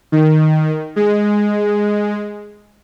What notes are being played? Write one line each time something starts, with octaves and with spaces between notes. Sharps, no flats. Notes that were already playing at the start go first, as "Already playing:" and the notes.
D#3
G#3